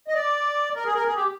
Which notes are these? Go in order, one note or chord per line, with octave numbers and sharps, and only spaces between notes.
D#5
D5
A#4
G#4
A#4
G#4
G4